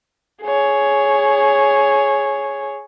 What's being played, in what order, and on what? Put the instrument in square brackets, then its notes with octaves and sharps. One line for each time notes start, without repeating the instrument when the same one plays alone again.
[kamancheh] G#4 C#5